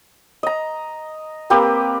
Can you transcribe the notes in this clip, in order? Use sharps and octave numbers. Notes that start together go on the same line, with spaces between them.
D#5 A#5
A#3 C4 G4 B4